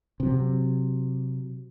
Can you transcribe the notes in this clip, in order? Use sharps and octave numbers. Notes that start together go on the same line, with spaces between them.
C3 F#3